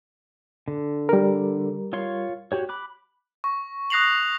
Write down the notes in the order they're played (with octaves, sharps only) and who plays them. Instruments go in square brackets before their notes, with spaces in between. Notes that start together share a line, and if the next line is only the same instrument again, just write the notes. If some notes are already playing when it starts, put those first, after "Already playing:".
[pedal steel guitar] D3
[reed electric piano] G3 A#4
[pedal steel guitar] F4 C#5 C6
F#4 G4 C#5
B5 D6 F#6
[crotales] C#6
D#6 F#6 A#6 C7 F7 F#7